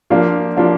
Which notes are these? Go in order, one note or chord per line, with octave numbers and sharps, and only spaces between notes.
F3 A#3 D4 F4
F3 A#3 D4 F4